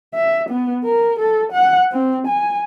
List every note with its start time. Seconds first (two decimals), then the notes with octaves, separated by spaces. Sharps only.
0.14 E5
0.49 B3
0.84 A#4
1.20 A4
1.52 F#5
1.92 C4
2.27 G#5